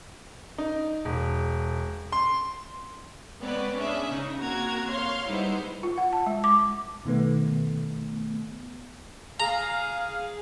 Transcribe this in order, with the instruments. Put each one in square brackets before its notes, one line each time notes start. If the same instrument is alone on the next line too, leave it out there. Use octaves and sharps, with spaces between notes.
[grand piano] D#4
E1
C6
[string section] G#3 B3 C4 B4 C#5 D5
C#4 D4 G#4 E5
C#3 D#4
A#3 C4 F#4 A#4 A#5 G#6
C#5 F5 C6
G3 G#3 B3 D#4 E4 C5
[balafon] F4
F#5
A5
G#3
D6
[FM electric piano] B2 D#3 A3 B3
[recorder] G#4 [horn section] F5 [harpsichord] A#5